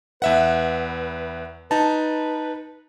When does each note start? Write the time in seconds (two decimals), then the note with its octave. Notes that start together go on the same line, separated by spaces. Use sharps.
0.22 E2 B4 E5 F#5
1.71 D#4 B4 A5